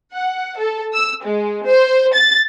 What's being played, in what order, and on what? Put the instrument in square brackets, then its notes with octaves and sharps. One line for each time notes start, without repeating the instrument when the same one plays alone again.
[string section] F#5
A4
E6
G#3
C5
A6